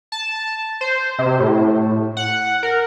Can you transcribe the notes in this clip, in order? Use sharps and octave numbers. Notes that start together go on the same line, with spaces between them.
A5
C5
C3
A2
F#5
A#4